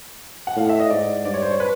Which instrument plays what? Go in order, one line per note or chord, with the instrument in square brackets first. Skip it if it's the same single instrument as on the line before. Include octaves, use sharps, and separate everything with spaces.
[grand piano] F#5
[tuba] A2 [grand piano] F5
[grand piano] E5
D#5
[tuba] G#2 [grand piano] D5
[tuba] G2 [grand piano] D5
[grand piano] C#5
C5
C#5
B4